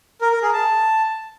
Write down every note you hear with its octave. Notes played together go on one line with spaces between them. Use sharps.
A#4
A#4
G#4
A5